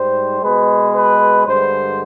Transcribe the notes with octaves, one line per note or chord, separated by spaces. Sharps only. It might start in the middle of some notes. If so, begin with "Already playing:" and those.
Already playing: G#2 G3 C5
B2 G#3 B4
B4
G2 D3 G#3 C5